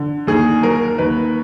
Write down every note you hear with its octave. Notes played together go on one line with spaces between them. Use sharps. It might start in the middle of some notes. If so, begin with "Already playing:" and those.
Already playing: D3
D#2 G#4
F#3 A#4
D#2 B4